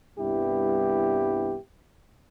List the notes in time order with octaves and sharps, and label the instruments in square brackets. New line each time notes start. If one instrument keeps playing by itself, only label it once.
[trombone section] C2 G2 B3 E4 G4